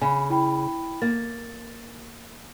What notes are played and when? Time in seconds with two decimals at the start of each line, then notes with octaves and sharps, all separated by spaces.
0.01 C#3 G#5 B5
0.30 E4 G5 B5
1.02 A#3 A6